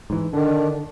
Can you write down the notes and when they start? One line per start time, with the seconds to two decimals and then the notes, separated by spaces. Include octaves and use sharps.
0.10 G#2 E3
0.33 D3 D#3 D4